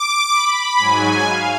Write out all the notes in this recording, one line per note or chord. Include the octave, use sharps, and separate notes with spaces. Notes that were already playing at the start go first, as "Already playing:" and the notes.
Already playing: D6
B5
G#2 F#3 G#5
F5